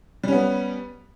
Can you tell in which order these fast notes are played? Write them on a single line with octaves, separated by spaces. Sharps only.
G3 C#4 B3